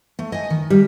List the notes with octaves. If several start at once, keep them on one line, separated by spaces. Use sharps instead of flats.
A3
D#5 G#5
D#3
G3